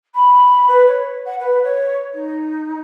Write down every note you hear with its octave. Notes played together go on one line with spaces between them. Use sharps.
B5
B4
C#5
F#5
B4
C#5
D#4